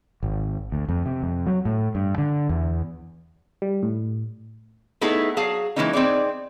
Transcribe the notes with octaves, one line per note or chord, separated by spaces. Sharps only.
G#1
D2
F2
C3
F2
F#3
A2
G2
D3
E2
G3
A2
A3 B3 D#4 E4 G#4 A4
F#3 G#4 F5 A5
E3 F3 G#3 A#3 C#4 D#4
C4 D#4 G#4 D5